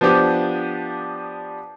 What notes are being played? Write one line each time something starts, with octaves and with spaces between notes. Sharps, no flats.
F3 B3 D4 G4